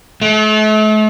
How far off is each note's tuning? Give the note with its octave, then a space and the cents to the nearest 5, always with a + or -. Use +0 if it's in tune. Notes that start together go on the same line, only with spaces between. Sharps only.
A3 -40